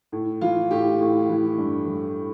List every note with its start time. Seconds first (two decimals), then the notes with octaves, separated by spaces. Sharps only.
0.12 A2
0.41 E3 F4
0.71 A2 G4
1.01 A2
1.29 E3
1.58 G2
1.87 E3